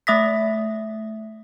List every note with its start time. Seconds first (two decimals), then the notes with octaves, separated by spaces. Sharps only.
0.07 A3 E5 D#6 A#6 B6